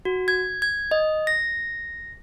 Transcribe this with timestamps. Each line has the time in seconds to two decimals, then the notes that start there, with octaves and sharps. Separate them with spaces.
0.05 F#4
0.28 G#6
0.62 G#6
0.91 D#5
1.27 A#6